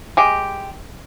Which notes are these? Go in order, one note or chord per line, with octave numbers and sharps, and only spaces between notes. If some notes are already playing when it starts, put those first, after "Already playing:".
G#3 G4